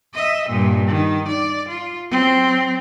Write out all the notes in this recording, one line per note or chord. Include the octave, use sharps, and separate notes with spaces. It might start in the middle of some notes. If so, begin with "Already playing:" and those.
D#5 E5
G2 A#2
D#3
D5
F4
F#3 C4